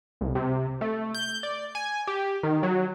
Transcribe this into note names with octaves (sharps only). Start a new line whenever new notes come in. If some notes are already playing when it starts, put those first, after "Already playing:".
C2
C3
A3
G6
D5
G#5
G4
D#3
F#3